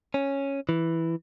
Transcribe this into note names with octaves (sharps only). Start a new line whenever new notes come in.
C#4
E3